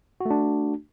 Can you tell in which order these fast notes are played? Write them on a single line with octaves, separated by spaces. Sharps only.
F#4 A3 D4